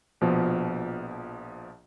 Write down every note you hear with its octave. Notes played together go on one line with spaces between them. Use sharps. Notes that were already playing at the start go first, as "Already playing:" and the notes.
A#1 B2 F3